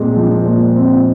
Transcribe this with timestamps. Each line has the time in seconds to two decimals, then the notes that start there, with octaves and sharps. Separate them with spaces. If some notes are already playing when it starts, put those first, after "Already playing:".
Already playing: A#2 G#3 C4
0.17 F3
0.45 A#2
0.76 C4